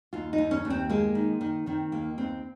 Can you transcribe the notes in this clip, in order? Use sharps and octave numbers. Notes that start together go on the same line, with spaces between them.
D#2 F4
D#4
D#2
C#4
D#2
C4
G#3 A#3
D#3
D#3
D#3 C4
D#2 A#3
D#2 C4